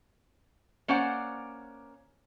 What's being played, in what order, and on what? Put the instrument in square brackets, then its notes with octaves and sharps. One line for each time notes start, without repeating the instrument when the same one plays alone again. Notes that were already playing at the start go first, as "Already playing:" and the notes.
[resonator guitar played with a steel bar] A#3 C#4 C5 D5 F#5